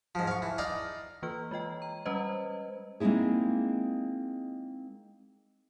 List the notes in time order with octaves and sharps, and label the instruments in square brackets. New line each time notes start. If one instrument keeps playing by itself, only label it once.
[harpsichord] G#2 F3
F5 C#6
E3
D#4 D5 F5
[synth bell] E3 A#3 F4 B4 F6
G#3 F4 D#5 G5
A#5
G3 G#3 C#4 B4 C5 D#5
[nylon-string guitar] G#3 A#3 C4 D#4 E4 G#4